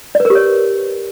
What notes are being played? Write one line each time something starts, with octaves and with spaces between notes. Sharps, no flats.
D5
B4
A#4
G4
C#5